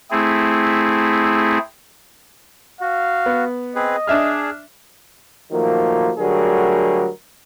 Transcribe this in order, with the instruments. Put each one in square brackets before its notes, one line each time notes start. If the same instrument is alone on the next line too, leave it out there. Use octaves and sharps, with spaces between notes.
[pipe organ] A3 C4 E4 G#4
[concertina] F#4 [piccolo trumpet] F5
[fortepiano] B3
[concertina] C4 G#4 B4 [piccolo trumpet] D#5
[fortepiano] D4 E5 F6 [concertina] G#4
[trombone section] D#3 F3 F#3 A3 A#3
D3 F#3 G3 A3 G#4 A#4